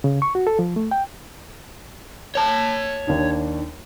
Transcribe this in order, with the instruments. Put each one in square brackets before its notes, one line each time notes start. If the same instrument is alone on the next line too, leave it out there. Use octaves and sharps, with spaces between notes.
[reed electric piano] C#3
C#6
F#4
A4
F3
A3
G5
[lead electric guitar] C#5 A5
[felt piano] D#2 D4 D#4